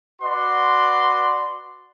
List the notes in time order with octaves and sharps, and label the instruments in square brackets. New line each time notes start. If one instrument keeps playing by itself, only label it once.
[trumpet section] F#4 B4 D5 C6